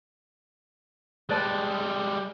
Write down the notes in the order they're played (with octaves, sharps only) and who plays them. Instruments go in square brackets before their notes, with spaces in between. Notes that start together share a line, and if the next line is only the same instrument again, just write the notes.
[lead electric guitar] G3 G#3 [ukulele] B4 D5 A5